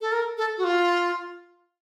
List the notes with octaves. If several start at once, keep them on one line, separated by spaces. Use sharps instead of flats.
A4
A#4
A4
F#4
F4